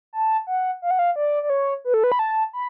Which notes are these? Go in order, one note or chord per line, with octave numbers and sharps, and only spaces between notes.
A5
F#5
F5
F#5
F5
D5
D5
C#5
B4
A4
B4
B5
A5
B5